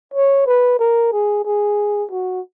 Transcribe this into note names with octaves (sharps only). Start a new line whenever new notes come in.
C#5
B4
A#4
G#4
G#4
F#4